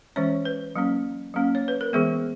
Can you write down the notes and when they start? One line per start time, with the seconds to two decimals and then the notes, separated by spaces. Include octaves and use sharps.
0.16 E3 G#3 C#4 C#5
0.45 B4
0.76 F#3 A#3 C#4
1.34 F#3 A#3 C#4
1.55 C#5
1.68 B4
1.81 A#4
1.93 E3 G#3 B3 G#4